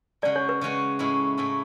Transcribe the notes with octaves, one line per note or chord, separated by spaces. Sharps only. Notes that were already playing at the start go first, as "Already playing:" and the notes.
C#3 G#3 C#4 F#4 D5
C#5
B4
C#3 G#3 C#4 F#4
A2 G#3 C#4 E4
A2 G#3 C#4 E4